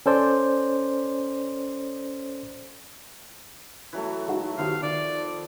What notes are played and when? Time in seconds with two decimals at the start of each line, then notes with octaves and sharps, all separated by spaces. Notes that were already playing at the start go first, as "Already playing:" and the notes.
0.06 C#4 A4 C5 D5
3.93 E3 F#3 A3
4.27 G#3 D#4 F#4
4.58 D#3 F3 B3 F#4 G4 F5
4.83 D#3 D5